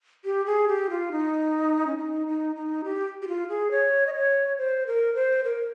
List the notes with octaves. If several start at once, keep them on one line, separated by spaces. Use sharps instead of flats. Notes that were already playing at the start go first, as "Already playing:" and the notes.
G4
G#4
G4
F4
D#4
C#4
D#4
D#4
D#4
G4
G4
F4
G#4
C#5
D#5
C#5
C5
A#4
C5
A#4